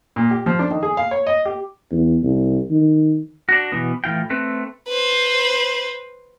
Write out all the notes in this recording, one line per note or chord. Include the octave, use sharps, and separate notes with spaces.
A#2
G4
F3
D4
D#3
G#4
F5
C#5
D#5
G4
E2
C2
D#3
D4 F#4
B2 E3 B3
A2 E3 F4 G5
A3 C4 B4
B4 C5